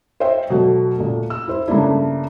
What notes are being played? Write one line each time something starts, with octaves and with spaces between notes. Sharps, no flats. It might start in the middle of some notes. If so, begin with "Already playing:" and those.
C5 C#5 D#5 E5 G5
B2 F#3 A3
A#2 A3
E6
E4 C5
G2 C#3 A3 A#3 D4 E4